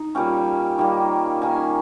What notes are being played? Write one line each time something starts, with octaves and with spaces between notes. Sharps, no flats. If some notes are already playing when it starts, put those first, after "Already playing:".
Already playing: D#4
A#2 G3 C#4 G5
D#3 G3 A#3
D#3 A#3 C#4 G#5